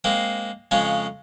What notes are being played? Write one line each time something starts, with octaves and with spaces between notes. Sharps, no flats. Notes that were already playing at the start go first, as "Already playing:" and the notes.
G#3 A#3 C4
F2 C#3 G#3 C#4